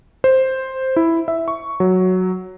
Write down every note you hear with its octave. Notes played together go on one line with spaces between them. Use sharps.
C5
E4
E5
C#6
F#3